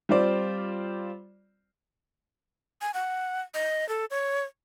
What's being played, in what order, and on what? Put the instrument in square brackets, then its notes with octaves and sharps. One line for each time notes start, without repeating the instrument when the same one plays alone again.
[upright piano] G3 C4 F4 C5 D5
[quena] G#5
F#5
D#5
A4
C#5